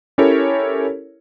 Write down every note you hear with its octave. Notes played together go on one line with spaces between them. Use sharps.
C#4 E4 G4 A4 A#4 C#5